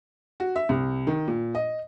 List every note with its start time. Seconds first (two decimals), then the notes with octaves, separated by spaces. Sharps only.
0.40 F#4
0.56 E5
0.69 C2
1.07 D#3
1.28 A#2
1.55 D#5